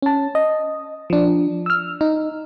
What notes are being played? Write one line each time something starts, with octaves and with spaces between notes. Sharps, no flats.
C#4 A5
D#5
F3 D4
E6 F6
D#4